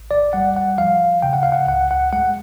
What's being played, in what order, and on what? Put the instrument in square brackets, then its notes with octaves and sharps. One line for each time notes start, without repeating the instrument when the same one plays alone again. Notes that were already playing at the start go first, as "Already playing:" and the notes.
Already playing: [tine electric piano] A1
D5
G3 F#5
F#5
F3 F5
C#3 G5
F#5
F5
F#5
C#2 F#5
F#5
G#3 F#5